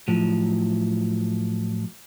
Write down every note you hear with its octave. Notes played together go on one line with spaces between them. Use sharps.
A2 F3 F#3